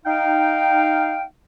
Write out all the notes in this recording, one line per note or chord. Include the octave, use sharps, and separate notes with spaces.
D#4 F5 G5